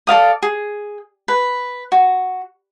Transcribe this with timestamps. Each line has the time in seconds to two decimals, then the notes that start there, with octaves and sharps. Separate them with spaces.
0.07 A4 D5 F5 D#6
0.43 G#4
1.28 B4
1.92 F#4